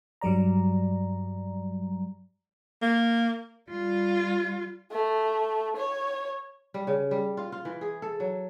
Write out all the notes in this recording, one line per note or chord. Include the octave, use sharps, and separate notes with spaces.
G2 F#3 G3 D5 A#5
A#3
G3 F4
A3
C#5
G3
C#3
G3
F4
F4
E3
G#4
A4
F#3